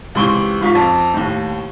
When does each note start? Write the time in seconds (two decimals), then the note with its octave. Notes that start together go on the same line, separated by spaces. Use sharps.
0.15 C#2 C3 E3 C6 C#6 G7
0.61 G#2 F4 C#6 B6
0.75 F2
1.14 D#2 A2